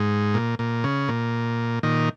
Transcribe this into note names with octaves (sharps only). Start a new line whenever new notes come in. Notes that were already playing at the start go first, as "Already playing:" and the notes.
Already playing: G#2
A#2
A#2
C#3
A#2
A#2 D#3